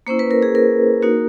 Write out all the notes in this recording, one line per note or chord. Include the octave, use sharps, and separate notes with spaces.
A#3 C#4 E4 C5
B4
A#4
G#4
A#4
A#3 D#4 F#4